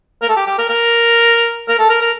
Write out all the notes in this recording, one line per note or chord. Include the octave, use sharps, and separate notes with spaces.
A#4
A4
G4
G4
A#4
A#4
A#4
A4
A#4
A#4